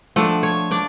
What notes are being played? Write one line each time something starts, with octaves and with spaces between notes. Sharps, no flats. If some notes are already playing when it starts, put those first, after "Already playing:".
F3 A3 D4 F#5
C#5
D4 D5